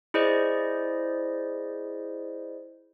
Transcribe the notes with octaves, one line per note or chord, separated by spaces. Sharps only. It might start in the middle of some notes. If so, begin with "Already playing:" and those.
E4 G#4 C5 D5 D#5